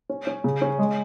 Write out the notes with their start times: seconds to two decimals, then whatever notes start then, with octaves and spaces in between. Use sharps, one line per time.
0.09 C#4
0.27 C#4
0.44 C#3
0.62 C#4
0.79 G#3